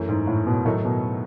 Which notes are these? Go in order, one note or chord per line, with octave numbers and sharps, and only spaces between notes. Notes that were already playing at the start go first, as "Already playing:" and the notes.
Already playing: F#2 E3 A3
G#2
A2
B2
A2 D#3 F#3 A3 D#4
B2